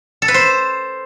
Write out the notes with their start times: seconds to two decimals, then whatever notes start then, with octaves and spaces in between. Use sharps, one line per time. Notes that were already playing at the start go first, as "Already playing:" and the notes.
0.22 A4
0.28 B4
0.34 C5